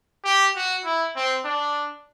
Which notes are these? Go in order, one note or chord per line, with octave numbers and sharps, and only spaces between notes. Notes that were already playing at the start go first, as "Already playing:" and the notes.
G4
F#4
E4
C4
D4